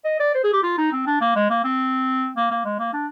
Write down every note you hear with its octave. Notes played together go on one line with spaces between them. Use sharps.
D#5
D5
C5
G#4
G4
F4
D#4
C4
D4
A#3
G#3
A#3
C4
A#3
A#3
G#3
A#3
D4